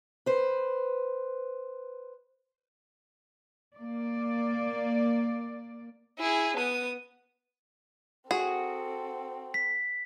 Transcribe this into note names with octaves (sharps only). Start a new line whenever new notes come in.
B4 C5
A#3 D5
E4 G#4
B3 D#6
C4 F#4 G#4 A4
B6